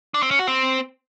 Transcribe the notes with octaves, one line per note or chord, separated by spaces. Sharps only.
D4
C4
C#4
F#4
C4